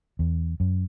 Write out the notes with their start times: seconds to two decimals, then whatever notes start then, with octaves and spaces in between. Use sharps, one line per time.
0.19 E2
0.60 F#2